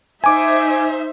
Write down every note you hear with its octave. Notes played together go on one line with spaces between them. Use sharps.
D#4 C5 E5 G#5 D6